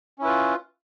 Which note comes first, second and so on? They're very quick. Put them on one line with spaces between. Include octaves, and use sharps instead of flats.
C#4 E4 B4 F4